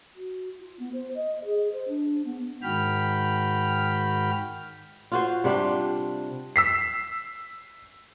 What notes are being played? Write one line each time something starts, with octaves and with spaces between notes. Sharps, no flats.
F#4
F4
B3
C5
D#5
G#4
C5
D4
B3
G#2 D#3 F#4 G5 B5 F6
F4 F#4 C5
C3 G3 D4 F4
E6 B6 C7